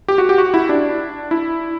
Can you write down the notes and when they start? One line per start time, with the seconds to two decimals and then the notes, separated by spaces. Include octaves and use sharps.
0.08 G4
0.18 F#4
0.29 G4
0.38 F#4
0.54 E4
0.69 D4
1.31 E4